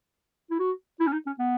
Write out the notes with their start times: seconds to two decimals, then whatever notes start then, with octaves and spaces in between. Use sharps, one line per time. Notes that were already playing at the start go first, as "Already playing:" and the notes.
0.51 E4
0.59 F#4
1.00 E4
1.07 C#4
1.13 D#4
1.26 C#4
1.39 B3